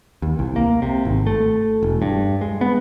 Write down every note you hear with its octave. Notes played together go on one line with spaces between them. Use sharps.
D#2
C2
A#3
C3
G#1
A3
E1
G2
G#3
B3